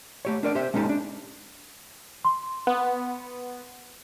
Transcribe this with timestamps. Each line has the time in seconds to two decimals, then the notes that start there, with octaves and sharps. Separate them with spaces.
0.25 A3 G4 C#5
0.43 D4 A#4 D5
0.55 G4 C5 E5
0.74 G#3 C#4 D#4 G4 A4
0.89 D4
2.25 C6
2.67 B3